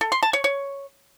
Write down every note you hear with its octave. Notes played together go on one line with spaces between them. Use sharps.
A4
C6
A5
C#5
C#5